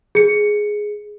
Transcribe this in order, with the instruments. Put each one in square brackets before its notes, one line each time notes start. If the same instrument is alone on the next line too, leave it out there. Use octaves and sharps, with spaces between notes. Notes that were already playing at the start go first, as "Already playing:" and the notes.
[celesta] G#4 C#7